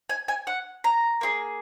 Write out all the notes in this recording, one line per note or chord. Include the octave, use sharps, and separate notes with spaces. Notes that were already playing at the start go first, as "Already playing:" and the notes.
G#5
G#5
F#5
A#5
A#3 F4 G#4